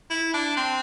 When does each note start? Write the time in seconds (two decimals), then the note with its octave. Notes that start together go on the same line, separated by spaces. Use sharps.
0.10 E4
0.33 D4
0.57 C4